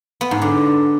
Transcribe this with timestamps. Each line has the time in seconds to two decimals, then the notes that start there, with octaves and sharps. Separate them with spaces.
0.21 B3
0.31 G#2
0.42 D3